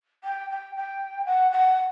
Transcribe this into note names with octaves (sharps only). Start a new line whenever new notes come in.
G5
G5
G5
F#5
F#5